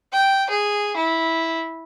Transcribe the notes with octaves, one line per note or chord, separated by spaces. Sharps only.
G5
G#4
E4